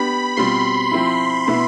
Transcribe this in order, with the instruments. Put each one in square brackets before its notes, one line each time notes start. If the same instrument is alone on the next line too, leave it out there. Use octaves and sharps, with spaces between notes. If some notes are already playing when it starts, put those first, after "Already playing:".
Already playing: [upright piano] B3 D4 G4 [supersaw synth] B5
[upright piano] B2 G3 C4 F4 [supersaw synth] C6
[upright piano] F3 C4 E4
B2 B3 E4